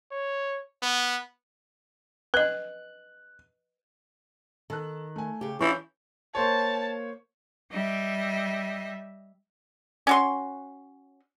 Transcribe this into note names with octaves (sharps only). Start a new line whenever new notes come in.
C#5
B3
B4 D#5 F#6
D#3 A4 A5 F#6
A3 G#5
C#3 G4
E3 C#4 D4 F4 C#6 G6
A#3 C5 C#5 A5
G3 D#5 E5
C#4 F#4 C6